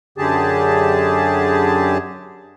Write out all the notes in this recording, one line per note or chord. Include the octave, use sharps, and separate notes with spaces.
F#2 D3 G4 G#4 A5